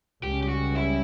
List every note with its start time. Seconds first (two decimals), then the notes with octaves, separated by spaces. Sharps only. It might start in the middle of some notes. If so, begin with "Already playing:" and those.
0.23 C#2 C#3 G3 C#4 G4
0.43 G4
0.49 F#4
0.75 E4